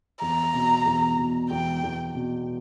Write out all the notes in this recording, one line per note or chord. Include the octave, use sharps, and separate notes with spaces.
E2 A#5
B2
E2
B2
E2 G5
E2
B2